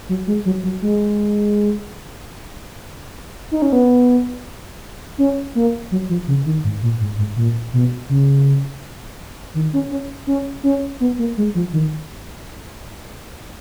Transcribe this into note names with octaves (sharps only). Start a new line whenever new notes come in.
F#3
G#3
F#3
F#3
G#3
D#4
C#4
B3
C#4
A#3
F#3
F3
C#3
D#3
G#2
A#2
G#2
G#2
A#2
B2
C#3
D#3
C#4
C#4
C#4
C#4
B3
A#3
G#3
F3
D#3